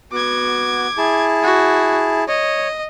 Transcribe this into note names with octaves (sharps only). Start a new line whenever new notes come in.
B3 F#4 D6 G#6
E4 G#4 A5
F#4
C#5 D#5